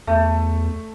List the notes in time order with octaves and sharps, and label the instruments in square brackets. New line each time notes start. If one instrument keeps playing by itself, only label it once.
[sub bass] E2 [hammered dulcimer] A3